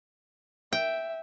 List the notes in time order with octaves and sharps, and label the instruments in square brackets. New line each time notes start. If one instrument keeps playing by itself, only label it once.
[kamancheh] E5 [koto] G5